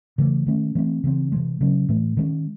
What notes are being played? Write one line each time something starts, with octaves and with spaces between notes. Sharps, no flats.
C#3 E3 A3
D#3 A3 C#4
E3 A3 C4
C#3 E3 C4
C3 E3 G#3
C#3 F#3 C#4
A2 E3 A3
D#3 G#3 C#4